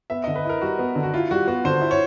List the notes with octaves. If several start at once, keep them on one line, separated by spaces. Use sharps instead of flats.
B3 E5
D3 D#5
B4
E4 A#4
G3 F#4
B3
D3
F#4
E4 F4
G3 F#4
B3 F#4
D3 C5
E4
C#5